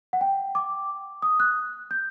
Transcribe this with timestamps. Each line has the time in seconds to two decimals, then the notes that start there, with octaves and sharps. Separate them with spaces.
0.13 F#5
0.21 G5
0.55 D6
1.22 D#6
1.40 F#6
1.91 G6